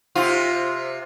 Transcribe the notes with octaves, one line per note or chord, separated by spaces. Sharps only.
C3 F4